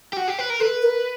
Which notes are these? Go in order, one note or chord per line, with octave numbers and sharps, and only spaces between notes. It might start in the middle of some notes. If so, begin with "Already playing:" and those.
G4
F#4
G4
B4
A#4
A4 B4
A#4